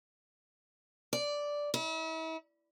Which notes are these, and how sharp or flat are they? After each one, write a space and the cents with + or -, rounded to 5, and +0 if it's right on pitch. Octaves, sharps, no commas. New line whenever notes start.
D5 -5
E4 -40